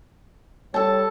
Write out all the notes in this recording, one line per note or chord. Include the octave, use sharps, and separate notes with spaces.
G3 A4 C#5 A5